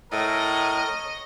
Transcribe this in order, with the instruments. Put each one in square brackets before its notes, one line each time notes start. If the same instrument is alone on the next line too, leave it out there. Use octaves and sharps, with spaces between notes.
[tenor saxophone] A2 [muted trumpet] A#4 [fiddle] C#5 D#5